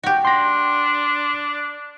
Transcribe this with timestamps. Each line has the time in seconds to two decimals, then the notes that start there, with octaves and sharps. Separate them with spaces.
0.03 F#4 G4
0.25 D4 C6 A#6